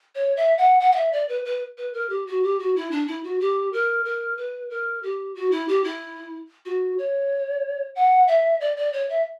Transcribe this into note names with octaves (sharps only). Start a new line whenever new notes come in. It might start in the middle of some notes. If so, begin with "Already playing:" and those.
C#5
E5
F#5
F#5
F#5
E5
D5
B4
B4
B4
A#4
G4
F#4
G4
F#4
E4
D4
E4
F#4
G4
A#4
A#4
B4
A#4
G4
F#4
E4
G4
E4
F#4
C#5
F#5
E5
D5
D5
C#5
E5